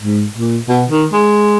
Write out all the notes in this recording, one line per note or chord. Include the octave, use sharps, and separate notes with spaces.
G#2
A#2
B2
D#3
G#3